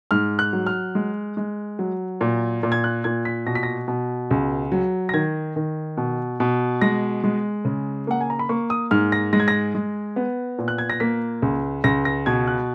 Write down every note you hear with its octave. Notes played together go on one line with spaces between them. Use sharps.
G#2 F6
F#6
F#3
F6
G#3
G#3
F#3
A#2
A#2
G#6
F#6
A#2 G#6
B6
B2 A#6
B6
A#6
B2
C#2
F#3
A#6
D#3 G#6
D#3
B2
B2
G#3 A#6
G#3
C#3
A#3 F#5
G#5
A#5
B5
A#3 C#6
D#6
G#2 F6
A#6
G#3 A#6
G#6
A#6
G#3
B3
A#2
F#6
G#6
A#6
A#3 B6
C#2
C#2 A#6
A#6
B2 G#6
F#6